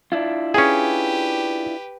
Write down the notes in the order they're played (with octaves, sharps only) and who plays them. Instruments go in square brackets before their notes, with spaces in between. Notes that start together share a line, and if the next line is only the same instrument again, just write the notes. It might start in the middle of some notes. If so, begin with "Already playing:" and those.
[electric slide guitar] D4 E4 F4
[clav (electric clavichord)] C#4 G#4 [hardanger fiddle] G4 B4